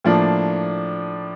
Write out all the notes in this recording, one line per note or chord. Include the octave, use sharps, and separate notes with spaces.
A2 F3 A#3 D4